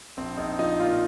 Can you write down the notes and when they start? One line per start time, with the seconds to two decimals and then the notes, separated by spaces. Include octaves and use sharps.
0.17 A#1 C4
0.37 A#1 D#4
0.59 F3 D#4
0.79 A#2 F4